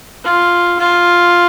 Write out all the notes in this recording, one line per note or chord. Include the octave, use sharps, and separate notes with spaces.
F4
F4